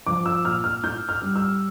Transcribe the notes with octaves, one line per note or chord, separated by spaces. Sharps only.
F3 D6
E6
A#2 F6
F6
A2 G6
F6
G3
E6